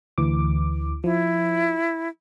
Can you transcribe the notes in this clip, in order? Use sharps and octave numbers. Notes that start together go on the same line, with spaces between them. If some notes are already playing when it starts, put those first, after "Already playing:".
D2 E3 D6
F3 E4